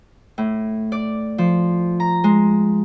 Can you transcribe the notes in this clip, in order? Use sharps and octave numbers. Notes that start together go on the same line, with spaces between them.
A2
D5
F3
A#5
G#3